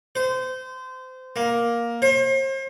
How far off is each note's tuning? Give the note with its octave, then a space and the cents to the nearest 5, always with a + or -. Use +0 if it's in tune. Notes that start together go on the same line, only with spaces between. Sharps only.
C5 -25
A#3 +10
C5 +40